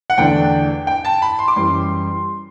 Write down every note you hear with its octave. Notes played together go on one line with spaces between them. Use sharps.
F#5
E2 D3 A3 D4 G5
G5
A5
B5
C6
D6
F#2 E3 G3 C6